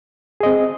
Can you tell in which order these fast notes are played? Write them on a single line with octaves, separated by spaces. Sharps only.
G#4 D#5 C4